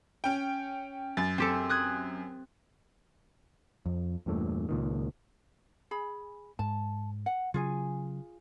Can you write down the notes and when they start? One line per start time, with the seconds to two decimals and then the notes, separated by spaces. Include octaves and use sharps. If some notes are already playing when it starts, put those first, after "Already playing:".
0.24 C#4 G5
1.17 F#2 A6
1.38 C4 G4 A4
1.69 D#6 F#6 G#6
3.86 F2
4.26 E2 G2 A#2 A3
4.69 C#2 A#2 D#3
5.91 G#4 B5
6.59 G#2 A5
7.26 F#5
7.54 C#3 F#3 F4 G#4 G#5